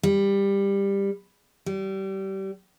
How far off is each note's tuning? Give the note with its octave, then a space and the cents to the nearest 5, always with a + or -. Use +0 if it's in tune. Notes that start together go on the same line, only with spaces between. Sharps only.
G3 +15
G3 -25